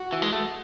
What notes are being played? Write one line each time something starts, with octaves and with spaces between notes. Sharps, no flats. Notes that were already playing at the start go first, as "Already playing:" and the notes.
Already playing: F#4
E3
G#3
A3